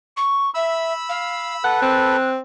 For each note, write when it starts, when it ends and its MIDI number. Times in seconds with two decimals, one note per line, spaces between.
0.16 0.49 85
0.54 0.92 76
0.54 1.64 83
0.54 1.64 88
1.09 1.52 77
1.64 2.16 69
1.64 2.16 71
1.64 1.80 78
1.64 2.28 90
1.82 2.39 60